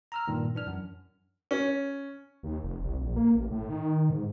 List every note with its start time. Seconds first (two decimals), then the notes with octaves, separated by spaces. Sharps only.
0.12 A#5 E6 F6
0.27 G2 A#2 D#3
0.55 E3 D4 F6
0.67 F#2
1.51 C#4
2.43 D#2
2.63 F1
2.83 C2
3.01 A#1
3.16 A#3
3.35 A1
3.51 A2
3.69 D#3
4.10 G#2